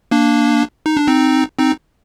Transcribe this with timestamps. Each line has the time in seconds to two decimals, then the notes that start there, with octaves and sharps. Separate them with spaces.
0.11 A#3 D4
0.86 D#4
0.97 D4
1.08 C4 D#4
1.59 C4 D#4